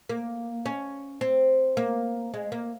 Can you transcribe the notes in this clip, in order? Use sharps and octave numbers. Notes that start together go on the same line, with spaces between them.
A#3
C#4
C4
A#3
G#3
A#3